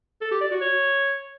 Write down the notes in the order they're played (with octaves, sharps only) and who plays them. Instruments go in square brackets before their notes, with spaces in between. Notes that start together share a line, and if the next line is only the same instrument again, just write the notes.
[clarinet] A4
G4
D5
F#4
C#5